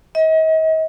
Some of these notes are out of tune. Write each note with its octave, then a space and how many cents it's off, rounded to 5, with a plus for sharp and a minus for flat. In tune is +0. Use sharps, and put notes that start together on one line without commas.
D#5 +40